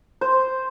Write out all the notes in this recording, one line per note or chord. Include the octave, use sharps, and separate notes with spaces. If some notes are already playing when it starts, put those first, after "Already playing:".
C5